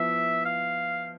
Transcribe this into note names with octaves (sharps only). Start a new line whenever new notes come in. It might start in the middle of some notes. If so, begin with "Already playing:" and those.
Already playing: F3 B3 E4 E5
F5